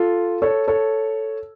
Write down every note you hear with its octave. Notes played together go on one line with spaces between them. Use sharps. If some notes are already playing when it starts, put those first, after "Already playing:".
Already playing: F4 A4
A4 C#5
A4 C#5